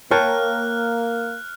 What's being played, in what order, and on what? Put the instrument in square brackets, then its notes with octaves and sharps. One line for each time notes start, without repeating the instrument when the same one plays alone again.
[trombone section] A#3 [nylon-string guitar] A#4 [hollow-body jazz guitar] C#5 G5 A5 [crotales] F6 F#6